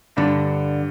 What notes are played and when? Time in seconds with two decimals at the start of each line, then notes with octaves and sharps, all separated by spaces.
0.17 G2 D3